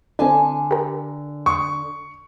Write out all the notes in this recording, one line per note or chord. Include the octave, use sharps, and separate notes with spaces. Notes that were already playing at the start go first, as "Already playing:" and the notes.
D3 C4 D4 G#5 A5
G4 A#4
C6 C#6 D#6